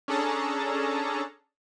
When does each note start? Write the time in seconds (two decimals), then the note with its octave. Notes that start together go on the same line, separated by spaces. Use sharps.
0.08 C#4 D4 G#4 A4 A5 A#5